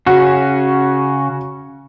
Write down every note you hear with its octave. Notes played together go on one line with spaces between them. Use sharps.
C#3 C#4 F#4